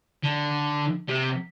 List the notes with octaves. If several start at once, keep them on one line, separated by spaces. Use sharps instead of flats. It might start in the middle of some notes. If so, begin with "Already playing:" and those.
D3
C3